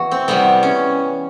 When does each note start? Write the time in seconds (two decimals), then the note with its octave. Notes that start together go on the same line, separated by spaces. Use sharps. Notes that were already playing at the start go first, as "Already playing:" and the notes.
Already playing: E2 E3 F#4
0.11 C4
0.28 E2 C3 E3 G3 B3
0.63 C#4